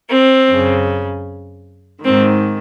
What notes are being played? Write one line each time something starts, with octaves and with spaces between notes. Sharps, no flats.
C4
F#2 C#3
G#2 D#3 C4